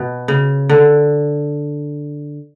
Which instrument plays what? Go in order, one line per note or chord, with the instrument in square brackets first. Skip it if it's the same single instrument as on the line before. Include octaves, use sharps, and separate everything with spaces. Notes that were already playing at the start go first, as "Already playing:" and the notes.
Already playing: [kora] B2
C#3
D3